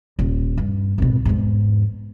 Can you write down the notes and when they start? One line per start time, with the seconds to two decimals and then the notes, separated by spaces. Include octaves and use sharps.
0.19 D#1
0.57 G2
0.98 G#1 B2
1.25 E2 G#2